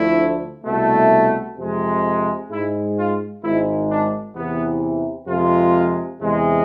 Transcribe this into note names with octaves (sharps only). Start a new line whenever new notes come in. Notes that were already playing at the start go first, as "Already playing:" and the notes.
Already playing: D2 D3 F3 A3 E4
C2 B2 A3
F2 C3 G#3
G#2 G#3 E4
F4
G#1 G#2 G#3 E4
D4
E2 C3 E3 B3
F2 C3 F3 G#3 F4
E2 C3 G#3